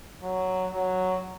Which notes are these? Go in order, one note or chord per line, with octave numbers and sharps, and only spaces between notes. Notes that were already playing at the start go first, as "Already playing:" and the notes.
F#3
F#3